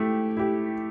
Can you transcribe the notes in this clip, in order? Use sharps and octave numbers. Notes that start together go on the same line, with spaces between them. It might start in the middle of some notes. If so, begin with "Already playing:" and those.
Already playing: A3 E4 G4
E4 G4